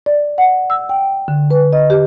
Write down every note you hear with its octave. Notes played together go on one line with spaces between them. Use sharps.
D5
F#5
E6
G5
D3
B4
D#5
G4